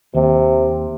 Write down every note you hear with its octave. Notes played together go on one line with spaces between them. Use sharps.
D#2 C3